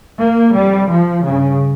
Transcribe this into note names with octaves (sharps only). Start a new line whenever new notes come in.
A#3
F2 C3 G3
F3
G2 C#3